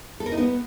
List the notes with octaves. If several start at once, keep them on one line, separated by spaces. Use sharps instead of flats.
A4
A#4
D#4
B3